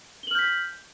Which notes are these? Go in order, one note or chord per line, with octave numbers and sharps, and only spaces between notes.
F6 G6 B6 F#7 G7